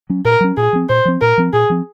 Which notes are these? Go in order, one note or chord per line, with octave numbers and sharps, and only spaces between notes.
F#3 C#4
A#2 A#4
F#3 C#4
A#2 G#4
F3 C4
A#2 C5
F3 C4
A#2 A#4
F3 C4
A#2 G#4
F3 C4